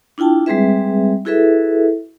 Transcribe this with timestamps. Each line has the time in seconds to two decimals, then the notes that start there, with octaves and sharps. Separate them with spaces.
0.18 D4 E4 F4 G5 A5
0.46 G3 G#3 C4 G#4 B4 E5
1.25 E4 F#4 G#4 A4 B4 E5